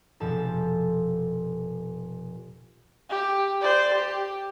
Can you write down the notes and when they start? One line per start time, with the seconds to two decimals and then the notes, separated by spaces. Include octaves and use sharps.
0.20 F1 B2 F3 A4 A5
3.09 G4
3.61 C5 D5
3.94 G4